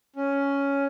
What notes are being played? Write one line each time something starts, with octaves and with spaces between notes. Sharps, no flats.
C#4